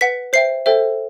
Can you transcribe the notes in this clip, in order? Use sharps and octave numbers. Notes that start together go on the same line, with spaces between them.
B4 F#5 B6
C5 E5 G5 C7
A4 C5 E5 G5